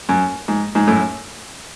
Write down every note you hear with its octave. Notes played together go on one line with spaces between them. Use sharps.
F#2
G#2
G#2
F#2 A2